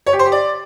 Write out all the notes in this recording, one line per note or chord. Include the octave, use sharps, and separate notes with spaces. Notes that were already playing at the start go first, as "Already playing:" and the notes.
C#5
G4
C5
G4
D5